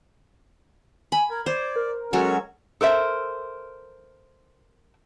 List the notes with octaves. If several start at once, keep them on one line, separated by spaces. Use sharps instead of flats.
G#5 B5
A#4 G#6
C5 D5
A#4
F#3 G#3 C#4 F#4 A4 C#5
A4 A#4 C5 E5